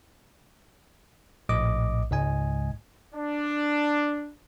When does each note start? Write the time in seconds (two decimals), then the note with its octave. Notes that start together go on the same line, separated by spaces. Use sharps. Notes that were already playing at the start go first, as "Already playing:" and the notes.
1.49 A#1 A2 D#5 D6
2.11 C#2 G#2 D#5 G#5
3.14 D4